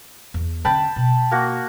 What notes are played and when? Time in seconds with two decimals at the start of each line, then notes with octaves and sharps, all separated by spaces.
0.34 E2
0.65 D3 C#4 G5 A5 B5
0.96 B2
1.31 A#3 F#4